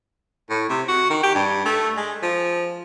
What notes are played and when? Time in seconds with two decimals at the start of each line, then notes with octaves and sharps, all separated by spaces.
0.50 A2
0.70 C3
0.89 F#4
1.10 D#3
1.23 G4
1.35 G2
1.66 A3
1.97 G#3
2.23 F3